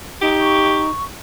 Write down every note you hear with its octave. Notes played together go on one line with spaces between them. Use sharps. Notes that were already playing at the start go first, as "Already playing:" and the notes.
D#4 G4
C#6